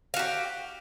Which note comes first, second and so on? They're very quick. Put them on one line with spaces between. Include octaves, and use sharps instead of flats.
F5 F#4 G4